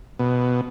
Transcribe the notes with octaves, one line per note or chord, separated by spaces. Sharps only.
B2